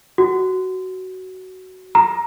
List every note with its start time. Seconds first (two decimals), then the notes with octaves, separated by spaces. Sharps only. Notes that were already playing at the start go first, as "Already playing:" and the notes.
0.18 F#4
1.95 A#5